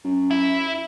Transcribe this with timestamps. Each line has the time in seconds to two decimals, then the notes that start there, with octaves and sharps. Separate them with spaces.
0.04 F#2
0.31 E4